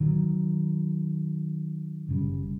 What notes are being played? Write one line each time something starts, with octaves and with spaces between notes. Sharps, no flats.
D#3 F#3
F#1 F#2 C#3 G3